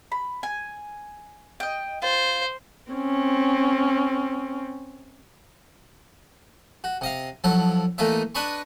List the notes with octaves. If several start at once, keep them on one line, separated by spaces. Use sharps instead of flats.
B5
G#5
D#5 G5
F4 C5
C4 C#4
F#4
C3 D#5 F5
F3 F#3 E4 A4
E3 A3 A#3 D#4 F4 E5
D4 B4 D#5 A5 B5 C#6